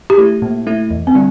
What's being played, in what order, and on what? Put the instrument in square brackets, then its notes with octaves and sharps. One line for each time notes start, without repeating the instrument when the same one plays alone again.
[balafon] G4
[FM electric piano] A3 E4
A#2
A3 E4
E2
[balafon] C4
[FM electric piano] D3 G3 D4